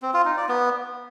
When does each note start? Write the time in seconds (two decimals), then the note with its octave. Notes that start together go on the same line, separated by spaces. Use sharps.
0.02 C4
0.14 F4
0.25 D#4
0.37 D5
0.49 B3